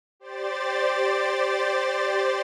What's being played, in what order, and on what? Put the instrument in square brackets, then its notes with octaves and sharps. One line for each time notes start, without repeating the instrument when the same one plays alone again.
[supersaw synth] G4 C5 D5 A6